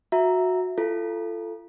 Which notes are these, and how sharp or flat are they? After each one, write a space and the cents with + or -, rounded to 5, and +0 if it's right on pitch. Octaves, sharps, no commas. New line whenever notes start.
F#4 -15 E5 +0 A#5 +0
F4 -30 A4 +0